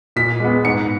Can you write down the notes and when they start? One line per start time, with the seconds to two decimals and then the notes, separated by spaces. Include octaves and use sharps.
0.16 A#2 B6
0.40 G#3 B3
0.65 G#2 C#7